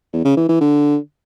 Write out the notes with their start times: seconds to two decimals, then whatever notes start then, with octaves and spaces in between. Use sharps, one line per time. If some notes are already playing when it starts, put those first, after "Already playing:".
0.13 E2
0.25 C#3
0.37 E3
0.49 E3
0.61 D3